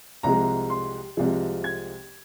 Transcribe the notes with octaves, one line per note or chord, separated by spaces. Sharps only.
C2 C3 F3 G#3 A#5
C6
C2 C3 F3 G#3
G#6